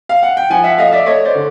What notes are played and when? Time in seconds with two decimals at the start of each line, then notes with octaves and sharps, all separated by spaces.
0.09 F5
0.23 F#5
0.37 G5
0.50 F3 F#5 G#5
0.64 E5 F#5
0.78 A3 D#5 F5
0.92 D5 E5
1.06 A3 C#5 D#5
1.25 C5 D5
1.35 D3